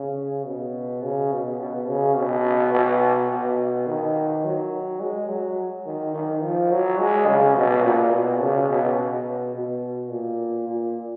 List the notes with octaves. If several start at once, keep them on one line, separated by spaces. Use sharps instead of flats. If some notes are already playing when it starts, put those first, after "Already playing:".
Already playing: C#3
B2
C#3
B2
B2
C#3
B2
B2
B2
D#3
F#3
G#3
F#3
D#3
D#3
F3
F#3
G#3
C#3
B2
A#2
B2
C#3
B2
B2
B2
A#2
A#2